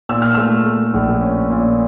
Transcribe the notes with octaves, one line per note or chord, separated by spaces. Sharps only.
A#2 E6
F6
A3 E6
A3
A#1
C#4
A#2